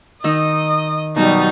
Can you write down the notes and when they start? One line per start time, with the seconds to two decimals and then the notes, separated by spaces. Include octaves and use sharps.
0.24 D#3 D#4 D#5 E6
1.16 B2 F#3 G3 D#4